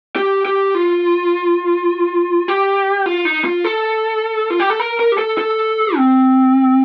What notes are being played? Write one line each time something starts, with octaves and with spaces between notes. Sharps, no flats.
G4
G4
F4
G4
F4
D#4
F4
A4
F4
G4
A4
A#4
A#4
G4
A4
A4
C4